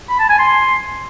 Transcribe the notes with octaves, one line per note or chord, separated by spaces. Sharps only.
B5
A5
G#5
C6